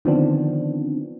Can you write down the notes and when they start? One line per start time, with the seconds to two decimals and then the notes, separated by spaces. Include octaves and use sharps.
0.05 D3 D#3 F3 B3 C4 D4